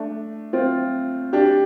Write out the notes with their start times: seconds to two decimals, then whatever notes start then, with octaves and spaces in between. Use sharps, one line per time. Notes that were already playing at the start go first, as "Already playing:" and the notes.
Already playing: A3 D4
0.53 C4 F4
1.33 D4 G4